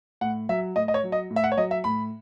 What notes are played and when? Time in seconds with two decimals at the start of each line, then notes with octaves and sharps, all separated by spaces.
0.21 A2 F#5
0.49 F#3 E5
0.76 A2 D#5
0.88 D#5
0.94 C#5
1.04 F#3
1.12 D#5
1.30 A2
1.36 E5
1.44 F#5
1.52 C#5
1.57 F#3 D#5
1.71 E5
1.84 A2 B5